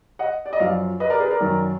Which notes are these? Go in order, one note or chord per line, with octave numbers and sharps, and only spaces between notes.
D#5 F#5
D5
D#5
F#2 F3 D5 F5
B4 D#5
A#4 D5
G#4 B4
A#4 D5
F#2 D#3